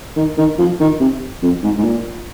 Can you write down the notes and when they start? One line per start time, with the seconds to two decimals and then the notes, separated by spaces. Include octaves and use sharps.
0.17 D#3
0.38 D#3
0.58 F3
0.80 D#3
1.00 C3
1.43 F2
1.63 G#2
1.78 G#2
1.84 A#2